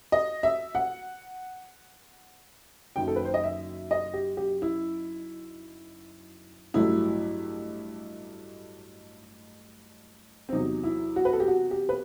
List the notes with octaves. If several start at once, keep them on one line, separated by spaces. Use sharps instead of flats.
D#5
E5
F#5
F#1 F#2 D#3 G5
A4
B4
C5
D#5
E5
D#5
G4
G4
E4
A1 G2 F#3 A3 E4
C4
E2 C3 F#3 D#4
E4
F#4
B4
A4
G4
F#4
G4
B4